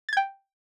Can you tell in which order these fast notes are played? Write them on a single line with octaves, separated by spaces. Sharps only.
A6 G#6 G5